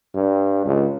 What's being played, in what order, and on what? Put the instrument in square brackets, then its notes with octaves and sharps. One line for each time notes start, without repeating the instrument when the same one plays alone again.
[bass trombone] G2
C#2